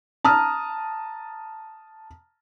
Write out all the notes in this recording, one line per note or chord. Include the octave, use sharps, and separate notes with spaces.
A5 A#5 D#6 F6